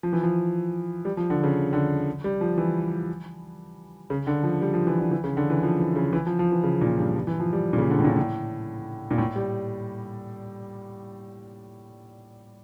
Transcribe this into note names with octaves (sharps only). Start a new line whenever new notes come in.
F3
E3
F3
G3
F3
D3
C#3
D3
G3
F3
E3
C#3
D3
F3
G3
F3
E3
D3
E3
C#3
D3
E3
F3
E3
C#3
E3
F3
F3
E3
C#3
A#2
G2
G2
E3
F3
G3
A#2
C#3
D3
A2
A#2
A2
A#2
A2
G3